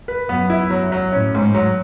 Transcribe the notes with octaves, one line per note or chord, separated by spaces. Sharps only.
B4
F#2 B3
E4
F#2 F#3
F#3
A2 C#4
G#2
F#3